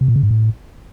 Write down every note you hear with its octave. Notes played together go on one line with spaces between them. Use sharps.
C3
A#2
C#3
G#2
A2